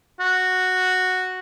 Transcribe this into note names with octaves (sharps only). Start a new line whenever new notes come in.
F#4